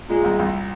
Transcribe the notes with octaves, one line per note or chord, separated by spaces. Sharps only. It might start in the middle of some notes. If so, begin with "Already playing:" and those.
A#2 G#3
C2
C2